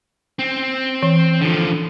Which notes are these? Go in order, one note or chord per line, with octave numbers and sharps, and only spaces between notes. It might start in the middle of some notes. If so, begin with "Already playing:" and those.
C4
E3
D3 F3